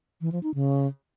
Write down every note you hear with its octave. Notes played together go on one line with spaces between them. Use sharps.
E3
F3
D#4
C#3